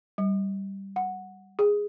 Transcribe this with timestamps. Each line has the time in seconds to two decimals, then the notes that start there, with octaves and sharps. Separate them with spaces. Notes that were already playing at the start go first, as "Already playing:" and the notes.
0.18 G3
0.96 F#5
1.59 G#4